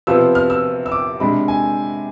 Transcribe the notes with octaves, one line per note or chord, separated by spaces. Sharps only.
C3 F3 B3 F4 E6
F6
E6
E6
D6
C3 G#3 D4 B5
G#5